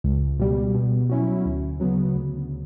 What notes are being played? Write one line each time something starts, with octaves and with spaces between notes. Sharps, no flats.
C#2
B2 G3
B2
F#3 C#4 E4
D2
C#3 F#3 B3
D2